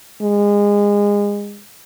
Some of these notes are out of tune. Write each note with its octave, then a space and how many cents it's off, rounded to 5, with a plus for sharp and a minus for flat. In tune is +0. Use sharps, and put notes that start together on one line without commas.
G#3 -25